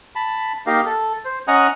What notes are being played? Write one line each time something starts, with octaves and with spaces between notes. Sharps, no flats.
A5 B5
A#3 D#4 G4 A#4 F5
A4
C5
C#4 D#5 F#5 G#5 A#5 D#6